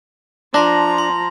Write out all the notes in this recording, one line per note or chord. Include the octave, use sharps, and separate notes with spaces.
F3 D4 A5 A#5 C6 A#6
C6